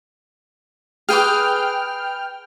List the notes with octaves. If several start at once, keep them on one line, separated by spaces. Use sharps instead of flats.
G#4 B4 G5 D6 F6